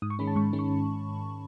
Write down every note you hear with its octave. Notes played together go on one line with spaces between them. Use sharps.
G#2 D#6
C#6
D#3 G#3 C#4 B5
A5
G#2 C#6
D#3 G#3 C#4
C#6